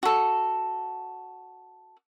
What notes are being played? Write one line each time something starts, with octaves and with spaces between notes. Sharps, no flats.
F#4 A4